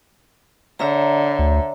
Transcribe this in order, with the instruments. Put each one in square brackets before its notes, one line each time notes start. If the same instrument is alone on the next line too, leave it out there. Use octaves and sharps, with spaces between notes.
[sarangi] D3 [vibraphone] C#5 E5 A#5
[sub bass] D2